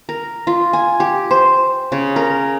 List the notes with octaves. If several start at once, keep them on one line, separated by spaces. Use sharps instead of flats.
A#4
F4
G#5
G4
C5
C#3
A#4